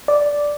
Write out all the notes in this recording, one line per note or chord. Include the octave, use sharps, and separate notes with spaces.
D5